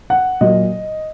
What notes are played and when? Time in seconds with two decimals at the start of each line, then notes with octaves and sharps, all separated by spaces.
0.10 F#5
0.41 A#2 F#3 D#5